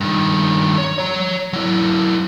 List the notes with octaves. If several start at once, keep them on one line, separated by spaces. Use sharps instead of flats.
G2 D#3
C#5
C#5 A#5
F#3 E4